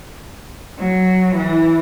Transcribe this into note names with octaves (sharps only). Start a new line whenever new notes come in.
F#3
E3